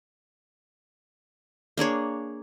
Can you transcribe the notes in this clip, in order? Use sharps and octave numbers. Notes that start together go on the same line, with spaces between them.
A#3 D4 G#4 C#5